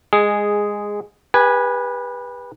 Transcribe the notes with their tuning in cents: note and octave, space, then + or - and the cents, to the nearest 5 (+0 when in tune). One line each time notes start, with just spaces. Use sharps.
G#3 -10 G#4 +0
G4 +35 B4 -15 G#5 +0